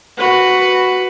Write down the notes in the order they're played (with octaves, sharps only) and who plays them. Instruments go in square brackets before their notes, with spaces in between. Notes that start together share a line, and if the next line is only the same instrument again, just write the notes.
[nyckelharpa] F#4 B4